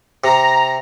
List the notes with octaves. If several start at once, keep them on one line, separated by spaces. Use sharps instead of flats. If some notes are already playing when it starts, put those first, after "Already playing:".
C3 A#5